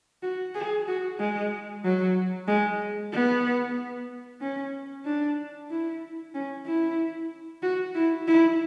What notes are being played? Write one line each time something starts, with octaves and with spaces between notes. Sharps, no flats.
F#4
G#4
F#4
G#3
F#3
G#3
B3
C#4
D4
E4
C#4
E4
F#4
E4
E4